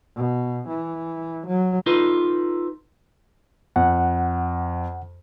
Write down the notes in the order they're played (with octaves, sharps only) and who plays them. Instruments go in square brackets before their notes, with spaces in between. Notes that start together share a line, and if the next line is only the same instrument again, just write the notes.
[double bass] B2
E3
F#3
[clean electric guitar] D#4 F4 A4 B4
[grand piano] F2 [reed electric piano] F#5